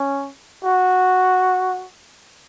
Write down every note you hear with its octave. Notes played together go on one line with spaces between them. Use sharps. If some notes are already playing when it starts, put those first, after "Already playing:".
Already playing: C#4
F#4